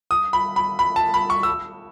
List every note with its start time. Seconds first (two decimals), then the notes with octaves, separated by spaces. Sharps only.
0.11 D#6
0.33 B5
0.56 B5
0.79 B5
0.96 A5
1.14 B5
1.30 C#6
1.43 E6